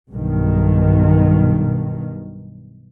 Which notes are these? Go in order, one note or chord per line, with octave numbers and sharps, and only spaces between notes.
B1 G2 B2 D#3